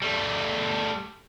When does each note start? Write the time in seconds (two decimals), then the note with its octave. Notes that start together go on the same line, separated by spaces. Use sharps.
0.02 G3 A3